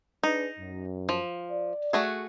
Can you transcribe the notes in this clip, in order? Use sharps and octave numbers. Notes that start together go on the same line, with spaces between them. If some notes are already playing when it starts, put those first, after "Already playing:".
D4 D#4 G#4 B4
F#2
F3
D5
A3 F#4 G#4